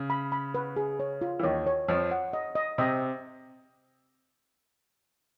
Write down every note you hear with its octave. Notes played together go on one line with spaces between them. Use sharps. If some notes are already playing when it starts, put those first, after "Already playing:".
Already playing: C#3
B5
B5
B4
G#4
C#5
F4
E3
D#2 D#3 C#5
C#5
F2 F3 C#5
F#5
D#5
D#5
C3 C4 D#5